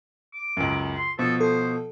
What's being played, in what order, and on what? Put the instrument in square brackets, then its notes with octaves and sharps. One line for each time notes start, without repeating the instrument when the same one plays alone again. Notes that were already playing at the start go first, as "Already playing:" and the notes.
[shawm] D6
[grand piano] C#2 F#2
[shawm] C6
[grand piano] B2 F3 [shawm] A4
[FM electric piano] A4 [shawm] C5